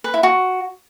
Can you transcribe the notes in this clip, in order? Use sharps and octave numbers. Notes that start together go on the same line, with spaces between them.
B4
E4
F#4